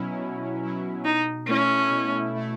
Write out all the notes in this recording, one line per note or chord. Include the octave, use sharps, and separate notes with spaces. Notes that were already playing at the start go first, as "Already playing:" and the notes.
Already playing: B2 F#3 C#4 E4
B2
F#3 C#4 E4
B2 D#4
A3 C#4 E4
B2
A3 E4